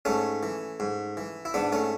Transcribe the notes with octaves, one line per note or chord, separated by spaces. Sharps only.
G#2 A3 C#4
E3
G#2
E3
E4
G#2 B3 D4
A3 C#4